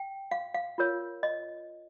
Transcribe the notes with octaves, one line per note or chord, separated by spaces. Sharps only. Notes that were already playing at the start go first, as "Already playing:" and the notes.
Already playing: G5
F5
F5
F4 A#4 C#5
D#5